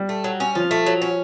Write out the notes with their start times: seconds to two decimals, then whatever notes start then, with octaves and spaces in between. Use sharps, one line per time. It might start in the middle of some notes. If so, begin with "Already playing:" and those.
Already playing: G3
0.09 A3
0.24 F#3
0.40 C#4
0.55 F3 F4
0.71 A3
0.86 F#3
1.02 C#4